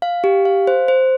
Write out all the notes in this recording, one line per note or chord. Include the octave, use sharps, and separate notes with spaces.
F5
G4
F5
C5
C5